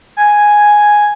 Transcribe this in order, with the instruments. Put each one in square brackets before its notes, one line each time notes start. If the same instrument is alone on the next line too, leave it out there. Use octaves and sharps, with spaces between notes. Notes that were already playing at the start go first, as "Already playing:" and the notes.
[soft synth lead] G#5